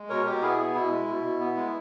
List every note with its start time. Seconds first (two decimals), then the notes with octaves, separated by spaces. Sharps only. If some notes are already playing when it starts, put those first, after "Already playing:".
Already playing: G#3
0.09 B2 A#4 C#5
0.26 B2 G4 A#4
0.42 B3 E4 G#4
0.58 B3
0.75 B2 E4
0.91 G#3
1.08 B2
1.24 B2
1.40 B3
1.57 G#3